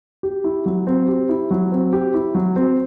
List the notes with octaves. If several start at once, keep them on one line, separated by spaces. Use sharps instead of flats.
G4
E4
F#3
C4
G4
E4
F#3
C4
G4
E4
F#3
C4